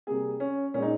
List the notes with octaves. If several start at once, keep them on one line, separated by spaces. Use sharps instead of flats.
C3 G3 A#3 G#4
C#4
A#2 G#3 C#4
D#4